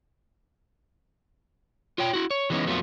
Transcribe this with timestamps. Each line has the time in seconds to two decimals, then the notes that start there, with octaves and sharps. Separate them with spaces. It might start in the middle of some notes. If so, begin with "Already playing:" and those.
1.98 F4 C#5 G5
2.13 E4 F#4
2.31 C#5
2.50 E3 F#3 G#3 B3 C#4 D#4
2.66 F2 F#3 A3 B3 F4